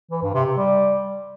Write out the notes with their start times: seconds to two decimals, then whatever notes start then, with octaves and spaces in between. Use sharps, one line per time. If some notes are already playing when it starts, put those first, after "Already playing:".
0.11 E3
0.22 G2
0.34 C3
0.46 C3
0.57 G3